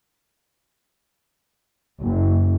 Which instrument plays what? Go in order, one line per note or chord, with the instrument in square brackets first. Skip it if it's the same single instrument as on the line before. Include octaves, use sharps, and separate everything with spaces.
[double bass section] F#1